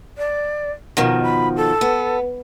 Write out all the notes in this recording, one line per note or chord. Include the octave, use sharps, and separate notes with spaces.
D5
B2 D#3 F3 D#4
B5
A4
B3